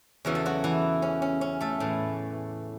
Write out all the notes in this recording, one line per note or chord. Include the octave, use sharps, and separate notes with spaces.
E2 C#3 E3 F#4
A4
F#3 F#4
E3 E4
C#4
C#4
C#4
A3 A4
A2 E3